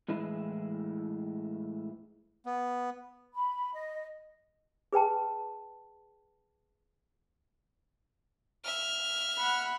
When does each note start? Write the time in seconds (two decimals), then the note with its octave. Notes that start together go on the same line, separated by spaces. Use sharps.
0.08 A2 E3 G#3 E4
2.46 B3
3.35 B5
3.74 D#5
4.93 G#4 B4 G5 A5
8.64 E5 F6
9.38 F#5 B5